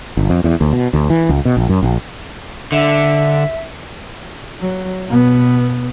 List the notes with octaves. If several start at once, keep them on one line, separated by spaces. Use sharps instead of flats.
G1
F2
E2
D2
B2
D2
E3
C#2
B2
A#1
F#2
A#1
D3 E5
F#3
B2 B3